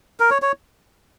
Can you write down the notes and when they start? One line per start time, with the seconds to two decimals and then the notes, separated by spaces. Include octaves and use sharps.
0.20 A#4
0.31 C#5
0.42 C#5